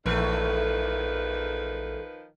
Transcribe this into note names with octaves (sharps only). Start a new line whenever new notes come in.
A#1 E2 G#2 D#3 F3 A3 B4